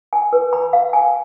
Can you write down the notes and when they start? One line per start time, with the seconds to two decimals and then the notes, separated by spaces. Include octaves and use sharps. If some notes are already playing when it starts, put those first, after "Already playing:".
0.13 G#5
0.33 B4
0.53 B5
0.73 F5
0.93 G#5